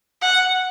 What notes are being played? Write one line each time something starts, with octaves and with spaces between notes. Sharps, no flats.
F#5